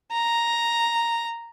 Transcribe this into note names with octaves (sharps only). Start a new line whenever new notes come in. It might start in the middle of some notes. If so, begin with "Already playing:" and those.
A#5